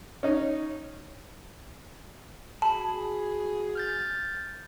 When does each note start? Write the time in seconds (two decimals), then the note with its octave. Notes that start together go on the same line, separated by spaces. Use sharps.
0.23 C#4 D#4
2.62 F#4 G#4 A5 B5
3.75 F6 G6 A6